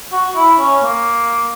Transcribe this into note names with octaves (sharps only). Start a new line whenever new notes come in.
F#4
E4
C#4
A#3